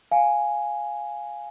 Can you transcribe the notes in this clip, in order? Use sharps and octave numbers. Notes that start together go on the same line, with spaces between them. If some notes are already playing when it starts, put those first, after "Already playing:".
F5 G#5